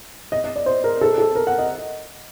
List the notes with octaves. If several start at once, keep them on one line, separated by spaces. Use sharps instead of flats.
D#5
D#5
D5
C5
A#4
A4
A4
A#4
F#5
D#5